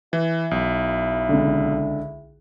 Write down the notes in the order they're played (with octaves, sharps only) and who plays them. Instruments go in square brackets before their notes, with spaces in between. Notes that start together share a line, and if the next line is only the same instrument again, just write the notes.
[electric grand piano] E3 [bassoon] E4
[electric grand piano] B1
[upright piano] C#2 D3